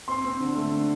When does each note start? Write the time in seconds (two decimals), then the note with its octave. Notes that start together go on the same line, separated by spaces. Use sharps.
0.08 C4 C6
0.25 C4
0.40 D3
0.56 A3
0.72 D3